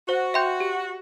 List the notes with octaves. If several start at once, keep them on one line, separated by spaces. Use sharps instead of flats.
F#4 C5
E5 G5 C6 G6
G4